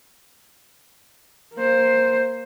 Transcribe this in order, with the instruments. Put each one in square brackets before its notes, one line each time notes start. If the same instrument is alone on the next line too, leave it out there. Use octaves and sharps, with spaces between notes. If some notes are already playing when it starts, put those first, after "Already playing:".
[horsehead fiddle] A#3 C5